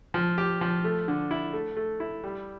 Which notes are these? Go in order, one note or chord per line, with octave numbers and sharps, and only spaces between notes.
F3
G4
F3
A3
D3
E4
A3
A3
E4
G3